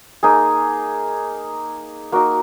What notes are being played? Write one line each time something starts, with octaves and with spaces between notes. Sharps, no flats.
A#3 D#4 G#4
A#3 D#4 F#4